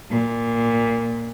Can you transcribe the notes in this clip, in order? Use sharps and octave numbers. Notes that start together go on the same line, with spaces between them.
A#2